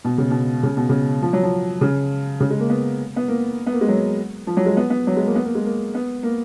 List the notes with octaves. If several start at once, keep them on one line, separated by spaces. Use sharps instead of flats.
B2
C#3
B2
C#3
B2
C#3
F3
F#3
F3
C#3
C#3
G#3
A#3
B3
B3
A#3
B3
A#3
G#3
F#3
F3
F#3
G#3
B3
B3
F#3
G#3
A#3
B3
A#3
G#3
A#3
B3
A#3